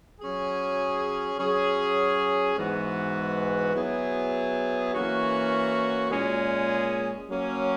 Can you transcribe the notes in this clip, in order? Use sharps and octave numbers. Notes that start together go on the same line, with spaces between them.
F#3 C#4 G#4
F#3 C#4 G#4
G#2 E3 B3 F#4
F#3 B3 E4 G#4
E3 A#3 C#4 F#4
A#2 G#3 C#4 G#4
F#3 A#3 C#4